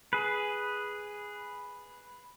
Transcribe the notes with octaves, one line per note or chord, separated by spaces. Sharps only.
G#4 B4